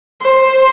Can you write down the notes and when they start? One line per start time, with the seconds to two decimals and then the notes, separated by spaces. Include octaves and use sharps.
0.21 C5